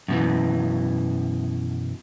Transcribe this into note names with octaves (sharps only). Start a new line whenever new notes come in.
F#2 B2 E3